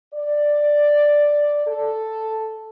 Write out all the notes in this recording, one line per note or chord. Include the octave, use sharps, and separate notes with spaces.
D5
A4